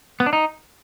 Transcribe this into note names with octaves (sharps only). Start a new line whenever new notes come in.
B3
D4
D#4